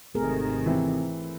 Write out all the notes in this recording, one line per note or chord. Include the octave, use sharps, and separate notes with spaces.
G#1 C3 D#3 A3 G#4 A#4
E3 C4